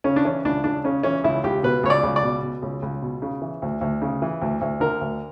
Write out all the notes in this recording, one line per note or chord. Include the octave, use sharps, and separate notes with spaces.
C#3 C#4
D4
E3 C#4
C#2 D4
C#2 D4
C#3 C#4
E3 C#4
C#2 E4
C#2 G4
B2 B4
C#2 C#5
D5
C#2
D5
B2
B2
C#2
C#2
B2
C#3
E3
D2
D2
C#3
E3
D2
D2
D3 A#4
D2